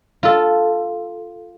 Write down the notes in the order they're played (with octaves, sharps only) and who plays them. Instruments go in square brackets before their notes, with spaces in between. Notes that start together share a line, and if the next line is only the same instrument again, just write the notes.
[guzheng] F4 A4